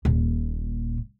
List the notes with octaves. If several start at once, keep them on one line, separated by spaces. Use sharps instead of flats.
D#1 A#2